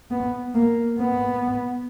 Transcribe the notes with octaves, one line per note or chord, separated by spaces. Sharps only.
B3
A#3
B3